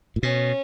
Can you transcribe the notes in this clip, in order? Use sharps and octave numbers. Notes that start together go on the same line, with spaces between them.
A2
B2 C#4